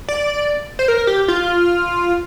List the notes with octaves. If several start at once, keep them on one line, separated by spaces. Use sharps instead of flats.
D5
C5
A#4
G4
F4